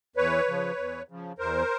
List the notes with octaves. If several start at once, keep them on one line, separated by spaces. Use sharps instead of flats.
E2 B4 C#5
C#3 F3
E2
C#3 F3
E2 A#4 C5